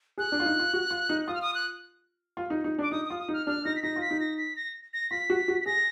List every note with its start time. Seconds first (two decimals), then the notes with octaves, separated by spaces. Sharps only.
0.18 G#4 F#6
0.32 D4
0.40 F4
0.46 D#4
0.59 F4
0.73 F#4
0.90 F4
1.09 D#4
1.27 F4 D#6
1.34 F6
1.42 D#6
1.55 F#6
2.37 F4
2.50 D#4
2.64 D#4
2.79 D4
2.82 D6
2.91 D#4 D#6
3.05 F4 D#6
3.20 D#6
3.28 D#4
3.33 F6
3.47 D4 F6
3.65 D#4 A#6
3.76 B6
3.83 D#4 A#6
3.96 F4
4.01 B6
4.11 D#4
4.20 A#6
4.38 B6
4.56 A#6
4.94 A#6
5.11 F4 B6
5.30 F#4
5.48 F#4
5.61 B6
5.66 G#4 A#6